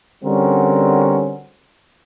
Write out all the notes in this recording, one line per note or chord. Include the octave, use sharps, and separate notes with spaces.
D3 G3 C4 C#4 F#4 A#4